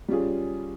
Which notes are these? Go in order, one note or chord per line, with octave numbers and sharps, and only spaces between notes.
G3 C#4 F4 G#4